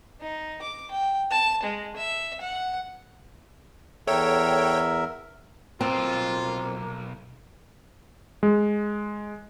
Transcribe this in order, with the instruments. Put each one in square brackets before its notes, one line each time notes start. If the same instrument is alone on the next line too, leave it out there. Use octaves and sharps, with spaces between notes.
[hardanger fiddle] D#4
D6
G5
A5
G#3
E5
F#5
[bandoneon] E2 A#4 E5 [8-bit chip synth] A4 C#5 G5
[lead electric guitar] B1 [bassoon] A#3 [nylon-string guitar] C4 [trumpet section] F4
[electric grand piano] G#3